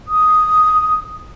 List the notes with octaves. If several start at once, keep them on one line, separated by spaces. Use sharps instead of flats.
D#6